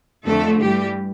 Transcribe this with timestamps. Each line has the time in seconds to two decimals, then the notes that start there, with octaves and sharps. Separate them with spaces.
0.25 F2 D3 F3 A3 A4
0.59 G2 E3 G3 G4